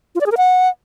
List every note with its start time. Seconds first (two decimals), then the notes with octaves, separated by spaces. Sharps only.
0.15 F4
0.21 D5
0.26 G#4
0.32 A#4
0.37 F#5